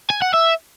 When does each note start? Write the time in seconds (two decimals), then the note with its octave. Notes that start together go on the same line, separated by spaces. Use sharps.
0.10 G#5
0.22 F#5
0.34 E5